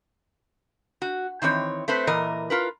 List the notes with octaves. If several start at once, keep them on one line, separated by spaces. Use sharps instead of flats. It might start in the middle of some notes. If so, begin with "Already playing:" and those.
F#4
D#3 E3 C4 C#5
A3 C4 B4 C5
A#2 E3 A#4 D#5
F4 A#4 B4